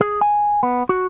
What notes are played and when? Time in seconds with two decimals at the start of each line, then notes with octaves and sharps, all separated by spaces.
0.01 G#4
0.21 G#5
0.63 B3
0.89 F#4